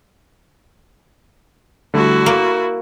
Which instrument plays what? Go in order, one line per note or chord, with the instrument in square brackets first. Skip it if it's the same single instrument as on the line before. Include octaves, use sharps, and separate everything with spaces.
[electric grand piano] D3 G3 A3 [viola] E4 F#4
[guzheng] A#3 [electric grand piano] D7